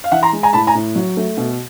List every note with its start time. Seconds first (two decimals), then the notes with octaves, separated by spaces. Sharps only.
0.04 F5
0.11 E3 E5 F#5
0.22 A#5 C6
0.33 G#3
0.43 G#5 A#5
0.53 A2 A5 B5
0.67 G#5 A#5
0.75 A2
0.95 F#3
1.17 A3
1.37 B2